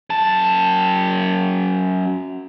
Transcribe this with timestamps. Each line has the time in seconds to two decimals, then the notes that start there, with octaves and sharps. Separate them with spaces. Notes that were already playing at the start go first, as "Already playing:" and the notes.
0.10 F#2 A5